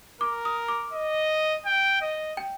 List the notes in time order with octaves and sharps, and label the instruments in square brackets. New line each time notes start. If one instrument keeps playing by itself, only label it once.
[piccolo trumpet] A#4 [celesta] D6
[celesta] D#6
D6
[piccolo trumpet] D#5
G5
D#5
[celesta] G5